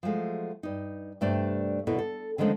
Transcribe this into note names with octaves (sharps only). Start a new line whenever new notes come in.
F3 F#3 G#3 A3
G2 D#4
G2 C3 A3 D4 C5 D5
E2 B2 D3 E4 A4 A#4
A4
D3 D#3 F3 G#3 A3 C#4